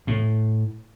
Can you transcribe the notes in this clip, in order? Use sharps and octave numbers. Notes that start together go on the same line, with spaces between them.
A2